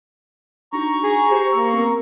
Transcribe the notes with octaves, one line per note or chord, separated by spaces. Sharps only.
D4 D#4 F#4 A#5 C#6
G#4
G4 C5
A#3 E6
B3 C4 A#4